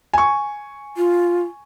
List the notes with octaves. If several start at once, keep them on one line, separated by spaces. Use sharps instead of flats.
G#5 C#6
F4